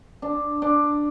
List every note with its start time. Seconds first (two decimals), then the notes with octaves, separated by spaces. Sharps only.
0.22 D4
0.62 D4